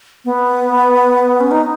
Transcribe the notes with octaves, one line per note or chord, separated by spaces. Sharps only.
B3
C#4
D#4